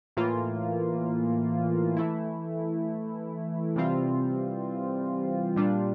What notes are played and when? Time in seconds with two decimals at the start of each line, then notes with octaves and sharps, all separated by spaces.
0.17 A2 E3 A#3 F4
1.97 E3 A3 E4
3.76 C3 E3 G3 C4 F4
5.56 A#2 G3 D4 F4